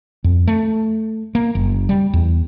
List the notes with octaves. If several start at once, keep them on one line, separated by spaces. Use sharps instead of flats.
F2
A3
A#3
F#1
G3
E2